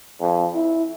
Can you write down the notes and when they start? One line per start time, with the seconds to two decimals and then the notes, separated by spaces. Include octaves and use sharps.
0.20 F2
0.55 E4